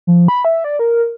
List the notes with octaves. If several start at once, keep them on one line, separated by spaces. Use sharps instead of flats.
F3
B5
E5
D5
A#4